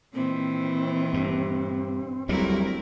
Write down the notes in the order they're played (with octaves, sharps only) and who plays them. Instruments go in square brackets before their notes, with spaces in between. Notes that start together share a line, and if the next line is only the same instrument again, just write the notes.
[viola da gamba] A#2 D#3 E3 [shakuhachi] C4
[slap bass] G2
[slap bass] D2 F#3 G3 [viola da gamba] A3 E4 A#4 [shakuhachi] C4